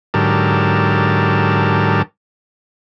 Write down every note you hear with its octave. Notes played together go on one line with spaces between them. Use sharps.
G#2 D3 F#3 G4 A#4 A5